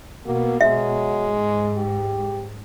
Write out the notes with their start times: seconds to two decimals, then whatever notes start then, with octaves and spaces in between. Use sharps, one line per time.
0.26 B2 A#3 F#4
0.61 F#3 G#3 E5
1.25 G#2
1.75 G4